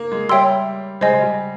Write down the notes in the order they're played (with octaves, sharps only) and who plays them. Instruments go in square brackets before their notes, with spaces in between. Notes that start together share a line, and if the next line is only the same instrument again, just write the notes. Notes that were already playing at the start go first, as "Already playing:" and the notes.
Already playing: [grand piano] A#3
G#3
[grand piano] G3 [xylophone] C#5 E5 G5 C6 E6
[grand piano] G#3 [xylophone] C5 D#5 G#5
[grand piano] G#3
G3